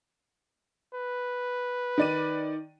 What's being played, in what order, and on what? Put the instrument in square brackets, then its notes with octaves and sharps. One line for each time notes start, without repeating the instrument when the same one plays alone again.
[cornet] B4
[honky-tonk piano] D#3 D5 D#7